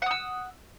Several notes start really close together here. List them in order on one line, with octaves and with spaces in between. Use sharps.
F#5 D#6 E6